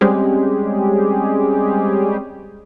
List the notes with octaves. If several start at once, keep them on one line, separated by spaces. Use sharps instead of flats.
G3 G#3 C4 C#4 G4 G#4